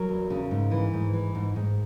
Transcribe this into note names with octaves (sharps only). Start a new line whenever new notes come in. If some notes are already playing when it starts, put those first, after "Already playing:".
Already playing: F#3 A#4
E2
C#3
G#2
E3
G#2
E3
G#2
G#2